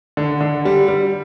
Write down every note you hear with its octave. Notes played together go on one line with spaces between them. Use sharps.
D3
D3
G3
G3